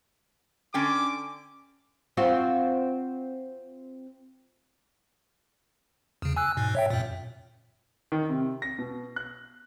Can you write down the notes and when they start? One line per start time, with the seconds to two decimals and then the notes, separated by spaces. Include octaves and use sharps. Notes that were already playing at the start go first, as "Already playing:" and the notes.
0.74 D3 C#4 G5 D6
2.17 C4 F4 F#4
6.22 E2 C#3
6.37 G#5 E6 F#6
6.57 G#2 B2
6.75 C#5 E5 G5
6.90 F#2 A#2
8.12 D#3
8.29 C3
8.62 A#6
8.79 B2
9.16 F#6